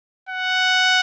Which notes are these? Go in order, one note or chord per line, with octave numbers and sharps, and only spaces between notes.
F#5